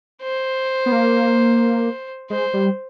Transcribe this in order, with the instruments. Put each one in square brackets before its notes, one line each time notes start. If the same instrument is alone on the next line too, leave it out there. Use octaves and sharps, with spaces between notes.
[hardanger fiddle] C5
[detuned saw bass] B3
A#3
[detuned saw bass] G#3 [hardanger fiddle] C5
[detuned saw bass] G3